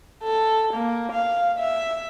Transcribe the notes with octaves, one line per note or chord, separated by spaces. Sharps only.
A4
A#3
F5
E5